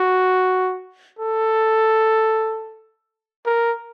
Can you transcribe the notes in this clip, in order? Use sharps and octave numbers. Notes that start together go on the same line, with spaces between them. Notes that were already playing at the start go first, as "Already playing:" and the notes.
Already playing: F#4
A4
A#4